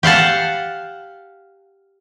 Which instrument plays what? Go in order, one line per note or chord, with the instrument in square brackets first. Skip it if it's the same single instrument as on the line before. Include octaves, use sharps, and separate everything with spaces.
[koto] G4 F5 F#5 A5